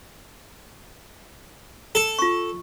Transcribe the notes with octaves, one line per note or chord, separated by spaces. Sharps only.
A4
F4 C#6